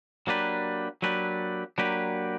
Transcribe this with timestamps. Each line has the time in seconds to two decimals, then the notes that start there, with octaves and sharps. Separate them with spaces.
0.27 F#3 A#3 D4 G4 B4
1.02 F#3 A#3 D4 G4 B4
1.78 F#3 A#3 D4 G4 B4